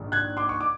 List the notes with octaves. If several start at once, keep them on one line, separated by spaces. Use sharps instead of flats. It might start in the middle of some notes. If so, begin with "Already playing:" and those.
Already playing: A#1 G#2 D#3
F#6 G#6
C6 D6
C#6
D6